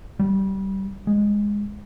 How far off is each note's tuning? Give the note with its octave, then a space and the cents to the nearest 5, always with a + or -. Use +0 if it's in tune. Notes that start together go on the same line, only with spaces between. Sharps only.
G3 -20
G#3 -10